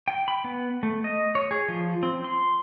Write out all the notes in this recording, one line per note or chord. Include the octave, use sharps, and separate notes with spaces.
G5
B5
B3
A3
D#5
C#5
G#4
F3
C4
C6